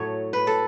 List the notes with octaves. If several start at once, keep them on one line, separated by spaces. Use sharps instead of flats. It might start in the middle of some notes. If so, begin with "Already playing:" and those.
Already playing: A2 F#3 A3 C#5
B4
A4